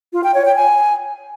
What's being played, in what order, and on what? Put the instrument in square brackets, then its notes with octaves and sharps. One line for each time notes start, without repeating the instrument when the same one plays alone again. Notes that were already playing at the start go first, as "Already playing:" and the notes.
[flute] F4
G5
C#5
G5
G#5